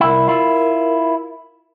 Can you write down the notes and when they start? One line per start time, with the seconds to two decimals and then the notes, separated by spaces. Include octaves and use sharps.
0.01 C2 E4 A#4
0.28 E4 F4